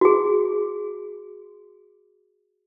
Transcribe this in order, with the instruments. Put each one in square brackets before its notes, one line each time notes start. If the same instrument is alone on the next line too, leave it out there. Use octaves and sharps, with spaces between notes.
[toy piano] F#4 G#4